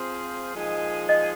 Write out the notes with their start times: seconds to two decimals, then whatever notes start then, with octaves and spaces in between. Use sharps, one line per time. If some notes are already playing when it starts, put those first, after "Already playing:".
Already playing: F3 C4 F4 G#4 C5
0.54 A#2 F3 G#3 D#4 G#4
1.09 D#5